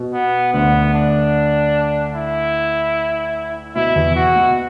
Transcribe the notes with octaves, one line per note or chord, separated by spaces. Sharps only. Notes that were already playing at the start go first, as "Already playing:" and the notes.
Already playing: B2
B3
D2 D3 B3
D4
E4
B2 E4
E2 E3
F#4
B2